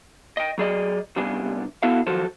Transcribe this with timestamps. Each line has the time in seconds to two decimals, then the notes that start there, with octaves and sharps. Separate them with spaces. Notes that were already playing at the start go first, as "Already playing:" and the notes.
0.37 D#5 G5
0.58 F#3 G#4 D5 D#5
1.16 C2 C#3 G3 B3 D4 G#5
1.83 B3 E4 F#4 A4 E5 F5
2.07 D#3 F3 F#3 F#4 A4 C5